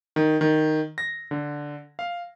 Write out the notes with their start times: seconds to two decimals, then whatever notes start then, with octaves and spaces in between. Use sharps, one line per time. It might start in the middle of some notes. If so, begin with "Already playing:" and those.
0.16 D#3
0.41 D#3
0.98 A#6
1.31 D3
1.99 F5